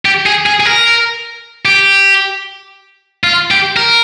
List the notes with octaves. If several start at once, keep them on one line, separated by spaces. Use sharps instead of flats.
G4
G#4
G#4
G#4
A#4
G4
F4
G4
A#4